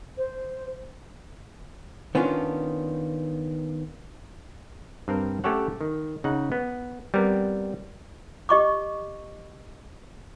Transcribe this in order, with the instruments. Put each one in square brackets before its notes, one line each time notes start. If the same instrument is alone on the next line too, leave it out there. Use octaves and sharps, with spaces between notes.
[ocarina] C5
[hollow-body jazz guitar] D#3 B3 C#4 D4 F4
[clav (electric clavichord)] G2 C4 A#4
A3 C#4 G4 A4 C#5 F#5
D#3
C#3 D#4 F#5
B3
G3 B3 C4 A#4
[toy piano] G4 D#5 C#6 D6